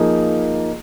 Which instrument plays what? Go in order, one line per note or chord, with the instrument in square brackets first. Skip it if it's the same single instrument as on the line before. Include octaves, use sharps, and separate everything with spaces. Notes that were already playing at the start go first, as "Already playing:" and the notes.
Already playing: [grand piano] F3 A#3 D#4 G#4